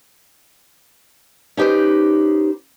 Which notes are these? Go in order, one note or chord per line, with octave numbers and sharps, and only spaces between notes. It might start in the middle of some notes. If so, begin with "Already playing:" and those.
C#4 D#4 G4 B4 C5